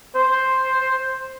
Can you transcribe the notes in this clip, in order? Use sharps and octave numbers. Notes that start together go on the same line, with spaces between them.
C5